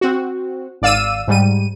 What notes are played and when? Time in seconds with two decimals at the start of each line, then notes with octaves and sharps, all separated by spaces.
0.01 C4 F#4
0.82 G#1 D5 F5 E6 D#7
1.28 G#2 G3 D#7